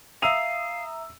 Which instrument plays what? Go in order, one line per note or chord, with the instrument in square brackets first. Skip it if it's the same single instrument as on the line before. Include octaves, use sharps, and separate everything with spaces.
[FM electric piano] E5 A#5 D#6 [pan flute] F5 [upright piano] E6 D#7 F7